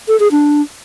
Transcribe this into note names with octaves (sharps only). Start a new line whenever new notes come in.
A4
G#4
D4